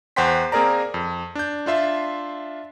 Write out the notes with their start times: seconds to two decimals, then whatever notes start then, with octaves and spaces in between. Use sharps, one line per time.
0.16 E2 C5 F#5 G5 C6 B6
0.52 A#3 C4 G#4 A#4 D5 A#5
0.94 F2
1.35 D4 G6
1.66 D4 F4 E5 C6